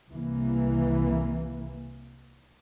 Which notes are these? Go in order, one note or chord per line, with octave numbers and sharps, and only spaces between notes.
C2 E3 A#3